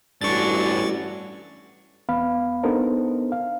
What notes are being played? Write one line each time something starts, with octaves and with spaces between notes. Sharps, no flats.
A1 G2 C#4 D4 F#4 C#6 A6
E2 B3 F5 B5
B3 D4 D#4 A4 A#4 C5
F5